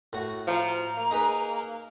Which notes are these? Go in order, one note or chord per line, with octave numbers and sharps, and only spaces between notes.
A2 F#4
F3 A#5
A#3
D#4 G#4 B4